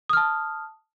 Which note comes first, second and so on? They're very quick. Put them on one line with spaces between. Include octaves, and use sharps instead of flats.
D#6 F6 A5